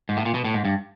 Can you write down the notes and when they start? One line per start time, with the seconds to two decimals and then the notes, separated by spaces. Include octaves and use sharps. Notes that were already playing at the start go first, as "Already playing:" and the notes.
0.09 G#2
0.17 A2
0.25 A#2
0.34 B2
0.44 A2
0.54 G#2
0.65 G2